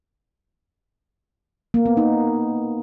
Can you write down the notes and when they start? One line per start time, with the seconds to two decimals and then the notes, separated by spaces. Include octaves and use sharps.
1.74 A#3
1.86 B3
1.97 D#4